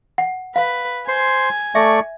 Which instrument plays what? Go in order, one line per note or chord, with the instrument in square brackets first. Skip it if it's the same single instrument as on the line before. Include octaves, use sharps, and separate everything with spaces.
[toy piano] F#5
[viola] B4 [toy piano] F5
[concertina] C5 C6 [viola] G#5
[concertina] A3 D5 C#6 [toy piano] E5